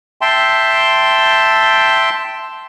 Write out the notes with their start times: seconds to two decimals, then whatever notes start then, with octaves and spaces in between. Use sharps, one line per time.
0.21 E5 G5 A5 C6